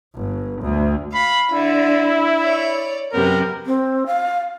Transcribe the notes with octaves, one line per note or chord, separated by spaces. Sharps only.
G1
D2
F5 B5
D3 E4
C#5 D5
F#2 C3 B3 A#4
C4
F5